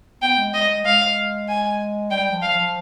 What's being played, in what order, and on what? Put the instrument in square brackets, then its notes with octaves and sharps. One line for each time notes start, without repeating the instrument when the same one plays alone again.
[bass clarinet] B3 [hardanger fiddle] G5
[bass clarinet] G#3
[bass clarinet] G#3 [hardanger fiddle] D#5
[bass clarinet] G#3
[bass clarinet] G#3 [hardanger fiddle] F5
[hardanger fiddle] G#5
[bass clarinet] G3 [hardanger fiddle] G5
[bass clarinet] F3
[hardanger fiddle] F5
[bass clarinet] F3